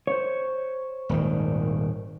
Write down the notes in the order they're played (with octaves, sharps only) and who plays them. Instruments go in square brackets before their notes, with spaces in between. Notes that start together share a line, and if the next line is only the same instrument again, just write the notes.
[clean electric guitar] C5 C#5
[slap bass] D#1 G#1 D#3